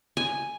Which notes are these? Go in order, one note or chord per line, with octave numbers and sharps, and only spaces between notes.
G#5